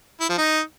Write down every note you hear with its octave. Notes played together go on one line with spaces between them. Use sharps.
E4
F3
D#4